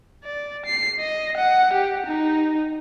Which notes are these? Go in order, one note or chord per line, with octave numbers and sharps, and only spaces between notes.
D5
C7
D#5
F#5
G4
D#4